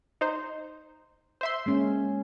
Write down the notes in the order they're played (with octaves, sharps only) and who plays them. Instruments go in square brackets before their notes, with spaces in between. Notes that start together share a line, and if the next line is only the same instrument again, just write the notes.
[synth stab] D#4 C5
C5 E5 C6
[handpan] G#3 A#3 C#4